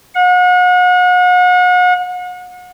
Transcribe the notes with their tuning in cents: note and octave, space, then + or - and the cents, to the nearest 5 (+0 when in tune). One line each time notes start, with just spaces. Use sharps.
F#5 -40